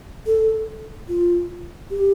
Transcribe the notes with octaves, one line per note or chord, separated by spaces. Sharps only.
A4
F4
G4